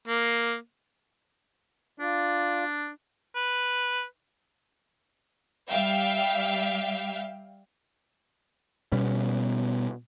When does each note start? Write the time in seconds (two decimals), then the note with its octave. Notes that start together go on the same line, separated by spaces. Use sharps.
0.08 A#3
2.00 D4 F4 D5
3.35 B4
5.70 G3 E5 F5 G5
8.92 B2 G3 B3 C#4